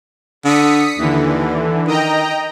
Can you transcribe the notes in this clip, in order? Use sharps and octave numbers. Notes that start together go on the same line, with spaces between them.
D3 D#6 B6 C#7
D#2 D3 E3
D#3 D#5 G5 A#5